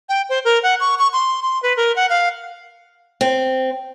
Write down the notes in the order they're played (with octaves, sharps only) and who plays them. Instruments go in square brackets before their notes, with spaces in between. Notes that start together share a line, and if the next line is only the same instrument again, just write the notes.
[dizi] G5
C5
A#4
F#5
C#6
C#6
C6
C6
B4
A#4
F#5
F5
[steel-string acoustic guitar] C4